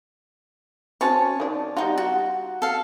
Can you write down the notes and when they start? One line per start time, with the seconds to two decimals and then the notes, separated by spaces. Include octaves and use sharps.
1.01 C4 C#4 F#4 C#5 G#5 A5
1.40 D#3 D4
1.77 G3 D#4 F4 F#4
1.97 F#4
2.62 A4 F5